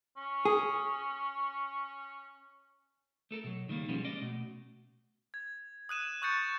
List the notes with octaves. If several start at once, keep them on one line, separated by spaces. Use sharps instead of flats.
C#4
G#4
A3 A4 A#4
B2 F#3
C#2 D#3 F#3 G3 A#3
B2 F3 G3 G#3 B3 C#4
G#3 C#4 D5 D#5
B2 A3
G#6
D#6 F#6 D#7 E7
C#6 D#6 F#6 G6 A6 C#7